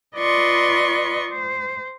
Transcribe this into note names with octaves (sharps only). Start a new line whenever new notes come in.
F4 B4 D5 D#5 C6 C#6
C5